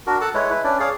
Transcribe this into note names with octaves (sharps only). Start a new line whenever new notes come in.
D4 F#4 A#4
A4 F#5 A5
G#3 E4 B4 C#5
E4 B4
C#4 D4 B4 D5
G#4 C#5 D5 F5